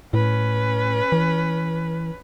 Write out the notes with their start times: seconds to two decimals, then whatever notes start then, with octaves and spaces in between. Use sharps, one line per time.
0.14 A2 C#4 B4
1.12 E3